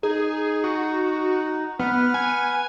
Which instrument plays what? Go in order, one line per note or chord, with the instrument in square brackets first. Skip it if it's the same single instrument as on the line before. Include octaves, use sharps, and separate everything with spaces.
[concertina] D#4 [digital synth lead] G#4
[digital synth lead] F#4
[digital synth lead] B3 [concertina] B4 F#5 F6
[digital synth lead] G#5